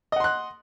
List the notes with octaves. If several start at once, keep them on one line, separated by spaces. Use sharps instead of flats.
D#5 F#5 C6 F#6